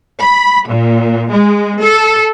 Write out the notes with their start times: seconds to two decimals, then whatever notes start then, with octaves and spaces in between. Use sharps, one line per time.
0.20 B5
0.66 A#2
1.31 G#3
1.81 A4